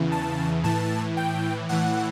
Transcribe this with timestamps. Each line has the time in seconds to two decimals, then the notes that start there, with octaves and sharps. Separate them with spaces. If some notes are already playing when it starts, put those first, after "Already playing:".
Already playing: E2 C#3 E3
0.12 A5
0.64 A2 E3 A5
1.17 G5
1.69 A2 E3 F#5